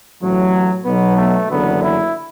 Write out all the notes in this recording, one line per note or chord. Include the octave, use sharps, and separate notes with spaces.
A1 A2 F#3
B1 B2 F#3 B3
A3
F#1 E2 D3 F#3 B3
E4